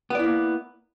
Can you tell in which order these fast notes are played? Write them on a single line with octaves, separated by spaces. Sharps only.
B3 D5 E4 A#3